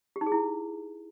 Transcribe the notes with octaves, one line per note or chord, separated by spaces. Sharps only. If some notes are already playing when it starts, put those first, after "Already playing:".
G4
D#4
G#4
E4